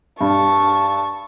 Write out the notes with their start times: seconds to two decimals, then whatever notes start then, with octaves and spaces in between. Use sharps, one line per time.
0.21 G2 A5 C#6